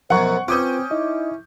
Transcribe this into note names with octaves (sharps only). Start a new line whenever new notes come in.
B1 F#2 F3 F#3 C5 F#5 A#5 C#6
C4 C#4 F4 B4 D6 D#6 G6
D#4 E4 D#5